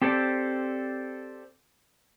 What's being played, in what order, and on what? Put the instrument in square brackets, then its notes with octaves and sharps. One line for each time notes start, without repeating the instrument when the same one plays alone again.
[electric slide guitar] C4 G4 A4 C5 D5